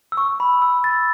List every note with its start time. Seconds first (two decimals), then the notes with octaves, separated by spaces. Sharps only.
0.12 E6
0.17 C#6
0.40 B5
0.62 E6
0.84 A6